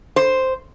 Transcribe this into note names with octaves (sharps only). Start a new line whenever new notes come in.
C5